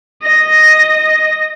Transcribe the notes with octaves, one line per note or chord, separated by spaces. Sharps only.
D#5 A#6